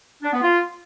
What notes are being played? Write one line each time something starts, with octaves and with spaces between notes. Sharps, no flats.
D4
B3
F4